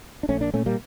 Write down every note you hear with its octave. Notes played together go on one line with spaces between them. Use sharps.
D4
A#1 A3 C#4
A#3 D4
A#2 A3 C#4
G3 A#3